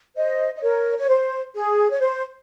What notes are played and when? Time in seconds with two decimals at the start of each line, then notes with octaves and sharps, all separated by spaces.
0.16 C5 D#5
0.56 D#5
0.62 A#4 C#5
0.98 C#5
1.08 C5
1.55 G#4
1.92 C#5
2.00 C5